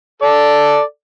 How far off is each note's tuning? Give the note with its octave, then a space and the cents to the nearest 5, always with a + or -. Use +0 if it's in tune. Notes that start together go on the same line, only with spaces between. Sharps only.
A4 +0 D5 +0